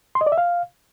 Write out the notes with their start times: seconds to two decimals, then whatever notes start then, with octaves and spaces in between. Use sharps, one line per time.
0.15 C6
0.21 D#5
0.26 D5
0.32 E5
0.38 F5